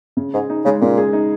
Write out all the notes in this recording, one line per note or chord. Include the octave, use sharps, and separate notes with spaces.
C#3
G#2 G#4
D#4
C#3 G#3
A#2 C#3
G#4
D#4